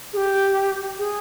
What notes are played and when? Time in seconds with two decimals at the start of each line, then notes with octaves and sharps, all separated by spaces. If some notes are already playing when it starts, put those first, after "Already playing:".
0.13 G#4
0.17 G4
0.99 G#4